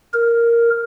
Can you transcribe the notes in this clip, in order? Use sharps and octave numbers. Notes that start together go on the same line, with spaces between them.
A#4